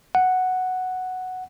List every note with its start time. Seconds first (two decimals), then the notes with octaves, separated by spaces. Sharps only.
0.15 F#5